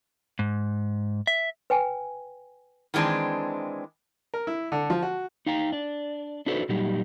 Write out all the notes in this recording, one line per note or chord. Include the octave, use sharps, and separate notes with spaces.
G#2
E5
B4 G5 G#5
D#3 E3 G#3 C4 D4
A#4
E4
D3
F3
F#4
D#4 F5 G5 A#5
D4 D5
D4 D#4 F#4 A4 B4 C5
A#2 F#3 G3 D#4 G4